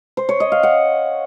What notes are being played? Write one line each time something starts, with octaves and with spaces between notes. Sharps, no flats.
C5
C#5
D#5
F5
F#5